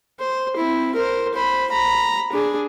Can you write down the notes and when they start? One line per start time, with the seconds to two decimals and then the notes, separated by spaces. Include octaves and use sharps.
0.19 C5
0.57 C4 E4
0.95 A#4 C5
1.34 C5 B5
1.70 A#5 B5
2.32 D4 G#4